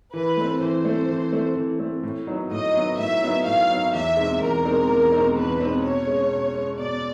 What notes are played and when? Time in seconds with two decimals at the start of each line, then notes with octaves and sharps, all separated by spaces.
0.14 E3 B4
0.37 A3 C4
0.61 E3 C5
0.85 A3 C4
1.09 E3
1.32 A3 C4
1.56 E3
1.79 A3 C4
2.03 A2
2.27 F#3 B3 D#4
2.51 A2 D#5
2.74 F#3 B3 D#4
2.98 A2 E5
3.22 F#3 B3 D#4
3.46 A2 F5
3.70 F#3 B3 D#4
3.93 E2 E5
4.17 B2 G#3 C4 D#4
4.41 E2 A#4
4.65 B2 G#3 C4 D#4
4.89 E2
5.12 B2 G#3 C4 D#4
5.36 E2 B4
5.60 B2 G#3 C4 D#4
5.83 B2 C#5
6.07 G#3 C#4
6.31 B2
6.54 G#3 C#4
6.78 B2 D5